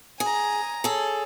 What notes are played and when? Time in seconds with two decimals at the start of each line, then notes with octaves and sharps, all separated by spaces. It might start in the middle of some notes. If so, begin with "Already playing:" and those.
0.20 G#4 G#5 A#5
0.84 G#4 A4 C#5